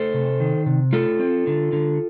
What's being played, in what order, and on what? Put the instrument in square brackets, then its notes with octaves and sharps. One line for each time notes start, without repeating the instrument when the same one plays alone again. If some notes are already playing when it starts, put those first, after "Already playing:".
Already playing: [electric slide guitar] A3 A4 C5
C3
D#3
C3
A3 F4 A4
C4
D3
D3